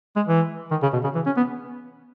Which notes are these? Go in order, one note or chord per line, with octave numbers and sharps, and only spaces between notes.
G#3
E3
D#3
C#3
B2
C#3
E3
C#4
B3